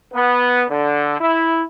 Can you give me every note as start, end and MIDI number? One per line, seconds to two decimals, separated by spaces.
0.14 0.64 59
0.69 1.19 50
1.20 1.63 64